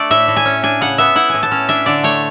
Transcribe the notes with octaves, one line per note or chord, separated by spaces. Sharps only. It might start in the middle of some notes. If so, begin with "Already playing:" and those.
Already playing: A3 D4 D5
A2 E5
A2
G#5
C#4
D4 G#5
C#3 F#5
B3 E5
E4 F#5
A2 G#5
A5
C#4
D4 E5
D3 D5
A3 C#5